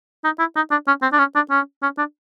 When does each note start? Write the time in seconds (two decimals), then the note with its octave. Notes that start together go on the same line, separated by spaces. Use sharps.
0.24 D#4
0.39 E4
0.56 D#4
0.71 D4
0.87 C#4
1.02 C4
1.13 D4
1.19 C#4
1.35 D4
1.50 C#4
1.83 C#4
1.98 D4